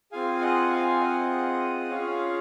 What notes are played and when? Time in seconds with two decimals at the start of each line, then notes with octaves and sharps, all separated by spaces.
0.12 C4 F4 G#4 F5 G#5
0.41 D#5 F#5
0.71 F5 G#5
1.00 D#5 F#5
1.90 C#4 F4 G#4 C#5 F5